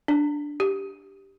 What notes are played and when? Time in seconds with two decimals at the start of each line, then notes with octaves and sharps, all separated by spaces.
0.08 D4
0.60 G4